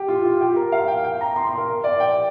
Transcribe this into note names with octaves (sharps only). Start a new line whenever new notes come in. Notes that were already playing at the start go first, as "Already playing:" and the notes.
Already playing: G4
F4
F4
G4
A#4
F5
G5
G5
A#5
C6
C6
A#4
D5
G5